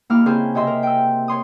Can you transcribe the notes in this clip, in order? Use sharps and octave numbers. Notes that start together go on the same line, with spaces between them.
D#2 A#3 E4 D6 F6
C#3 C4 E4 G#4 C5
C3 D#5 E5 C6
A#4
G5 E6
C#5 C6 D#6